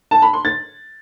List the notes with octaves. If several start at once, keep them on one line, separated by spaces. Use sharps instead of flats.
A5
B5
C6
A6